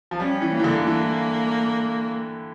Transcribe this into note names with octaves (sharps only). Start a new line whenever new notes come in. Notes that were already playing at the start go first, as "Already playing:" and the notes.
F3
G3 C#4
E3
A#3
E3
D3
E3 A#3